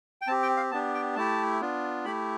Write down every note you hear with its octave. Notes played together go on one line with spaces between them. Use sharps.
G5
C4 G4 A5
G5
F5
B3 D4 G4 A5
G5
A3 E4 G4 A5
B3 D4 F4
A3 E4 G4 B5